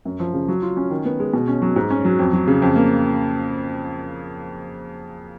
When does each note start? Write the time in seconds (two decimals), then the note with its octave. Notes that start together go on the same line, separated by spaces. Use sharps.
0.05 F#2
0.20 F3
0.34 C#3
0.48 F#3
0.62 F4
0.77 C#4
0.91 D#3
1.05 B3
1.20 G#3
1.33 B2
1.48 C#4
1.62 F#3
1.76 G#2
1.90 C#4
2.05 F#3
2.19 F2
2.33 F#3
2.48 C#3
2.62 F2
2.76 A#3